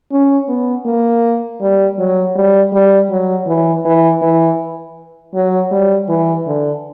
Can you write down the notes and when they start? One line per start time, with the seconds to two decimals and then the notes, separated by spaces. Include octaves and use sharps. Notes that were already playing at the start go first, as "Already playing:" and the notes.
0.12 C#4
0.48 B3
0.86 A#3
1.61 G3
1.99 F#3
2.36 G3
2.73 G3
3.10 F#3
3.47 E3
3.85 E3
4.22 E3
5.34 F#3
5.71 G3
6.09 E3
6.47 D3